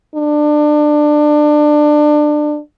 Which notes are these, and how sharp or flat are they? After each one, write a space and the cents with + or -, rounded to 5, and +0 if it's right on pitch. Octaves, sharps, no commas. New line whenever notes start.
D4 +25